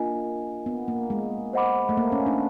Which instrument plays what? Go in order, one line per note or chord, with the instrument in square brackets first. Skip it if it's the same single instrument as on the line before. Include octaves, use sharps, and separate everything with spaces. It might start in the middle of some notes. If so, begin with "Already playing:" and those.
Already playing: [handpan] A#3 [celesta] D4 F4 A#4 D#5 G#5
[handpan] B3
A#3
G#3
[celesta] C5 D#5 F#5 B5 D6
[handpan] A3
A#3
C#4
D4